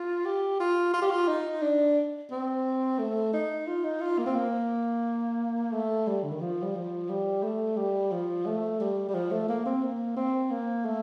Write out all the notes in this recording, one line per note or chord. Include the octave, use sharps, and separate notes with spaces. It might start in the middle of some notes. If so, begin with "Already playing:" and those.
Already playing: F4
G4
F4
F4
G4
F4
D#4
D4
C4
A3
D#4
F4
D#4
F4
A#3
C4
A#3
A3
G3
D3
D#3
F3
G3
F3
G3
A3
G3
F3
A3
G3
G3
F3
A3
A#3
C4
A#3
C4
A#3
A3